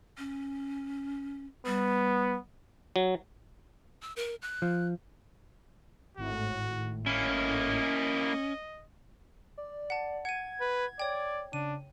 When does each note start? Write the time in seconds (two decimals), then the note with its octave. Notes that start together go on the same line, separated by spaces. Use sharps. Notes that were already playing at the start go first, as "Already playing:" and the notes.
0.18 C#4
1.66 G3 B3
2.96 F#3
4.02 E6
4.16 A#4
4.42 F#6
4.62 F3
6.17 G#1 A2 F#4
7.06 A#3 C#4 E4 D#5
9.58 D5
9.90 F#5 A5
10.25 F#5 G#6 D#7
10.61 B4
11.00 C#5 D5 G5
11.53 C#3 D4 D#7